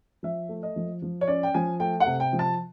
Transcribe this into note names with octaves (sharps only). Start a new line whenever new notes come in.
F3 E5
A3
D#5
F3
F3
C#5
C#4 D5
G5
F3 G#5
A3 G5
F#5
C3
G5
F3
A5